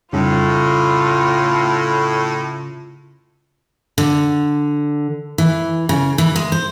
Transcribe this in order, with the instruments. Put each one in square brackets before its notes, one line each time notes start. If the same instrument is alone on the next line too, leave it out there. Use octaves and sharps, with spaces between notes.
[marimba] F2 G3 D#4 [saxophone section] A2 [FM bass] C#3 [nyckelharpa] F4
[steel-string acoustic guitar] D3
E3
C#3
E3
G#3
C5